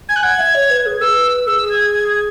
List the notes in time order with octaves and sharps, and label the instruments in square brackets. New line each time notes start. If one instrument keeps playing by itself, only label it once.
[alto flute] G#5 [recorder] G#6
[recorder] F#6
[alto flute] F#5 [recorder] G#6
[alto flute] E5
C#5
B4
G#4
[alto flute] B4 [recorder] E6
[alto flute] G#4 [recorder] E6
[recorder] G#6
G#6
G#6